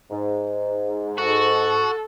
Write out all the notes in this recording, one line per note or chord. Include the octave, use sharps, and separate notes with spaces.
G#2
F#4 A4